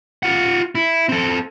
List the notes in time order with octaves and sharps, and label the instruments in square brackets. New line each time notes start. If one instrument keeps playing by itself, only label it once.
[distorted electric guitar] F4 F#5
E4
C4 A4